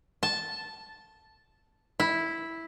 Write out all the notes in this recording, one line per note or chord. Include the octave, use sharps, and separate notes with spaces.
A5
E4